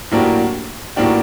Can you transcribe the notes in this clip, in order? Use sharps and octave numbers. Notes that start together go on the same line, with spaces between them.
A2 F#3 A#3 D4 G4
A2 F#3 A#3 D4 G4